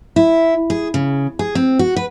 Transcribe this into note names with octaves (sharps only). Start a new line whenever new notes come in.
E4
G#4
C#3
G#4
C4
F#4
B4